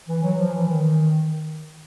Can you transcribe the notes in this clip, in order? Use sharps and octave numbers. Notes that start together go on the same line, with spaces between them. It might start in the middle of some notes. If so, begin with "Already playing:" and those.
E3
F#3
F3
E3
D#3